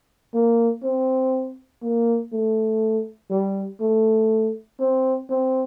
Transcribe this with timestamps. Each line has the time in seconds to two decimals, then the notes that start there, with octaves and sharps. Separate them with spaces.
0.34 A#3
0.83 C4
1.82 A#3
2.32 A3
3.30 G3
3.80 A3
4.80 C4
5.30 C4